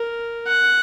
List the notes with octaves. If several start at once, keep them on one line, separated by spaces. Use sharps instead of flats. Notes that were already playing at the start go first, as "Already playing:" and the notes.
Already playing: A#4
F#5